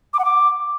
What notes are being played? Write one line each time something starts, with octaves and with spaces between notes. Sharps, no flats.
D6
F#5
D6